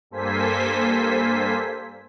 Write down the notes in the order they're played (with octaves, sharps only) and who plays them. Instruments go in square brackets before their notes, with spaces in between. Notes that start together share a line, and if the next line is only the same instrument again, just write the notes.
[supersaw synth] G2 A#3 A4 C5 G#5 B6